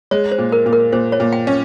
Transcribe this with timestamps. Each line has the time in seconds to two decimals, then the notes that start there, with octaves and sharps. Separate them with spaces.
0.11 G#3 C#5
0.32 C5
0.38 A#2
0.52 A#4
0.66 A#2
0.73 A#4
0.92 A#2 C5
1.12 C#5
1.20 A#2
1.33 G5
1.47 C#4